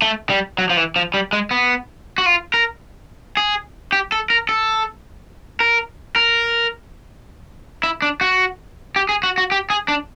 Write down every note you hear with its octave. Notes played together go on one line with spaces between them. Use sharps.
A3
G3
F#3
F3
E3
F3
G3
G#3
B3
F#4
F4
A#4
G#4
G4
A4
A#4
A4
A#4
A#4
E4
D4
F#4
G4
G#4
F#4
F#4
G4
G#4
D4